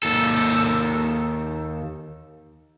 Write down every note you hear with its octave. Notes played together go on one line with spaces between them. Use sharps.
D#2 A4